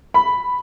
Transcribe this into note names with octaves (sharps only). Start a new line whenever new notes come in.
B5